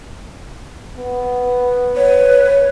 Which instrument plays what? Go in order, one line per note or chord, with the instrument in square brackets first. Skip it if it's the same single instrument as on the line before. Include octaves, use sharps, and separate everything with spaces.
[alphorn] B3
[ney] B4 [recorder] C#5